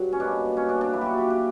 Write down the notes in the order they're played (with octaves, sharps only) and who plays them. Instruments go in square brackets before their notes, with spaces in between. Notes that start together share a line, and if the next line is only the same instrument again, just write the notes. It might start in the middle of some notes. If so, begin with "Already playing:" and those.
Already playing: [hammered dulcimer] G2 F#3
C#4
B2 A#3 D4
C#4
D4
D4
A#2 F#3 A#3 E4
F#4 G4
G4
G4